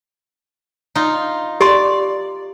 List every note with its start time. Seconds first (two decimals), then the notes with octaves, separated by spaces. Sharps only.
0.95 D#4 F4
1.61 G4 D5 C6